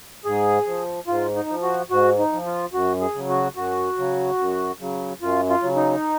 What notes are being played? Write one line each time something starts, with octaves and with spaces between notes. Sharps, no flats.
G#2 G#4
F3
G#2 F4
D#4
F3
F#4
G#2 F#4
D#4
F3
F4
F#2 F#4
G#4
C#3 F#3
F#4
F#2 F#4
C#3 F#3
F#2
C#3 F#3
F#2 F4
F4
C#3 F#3
D#4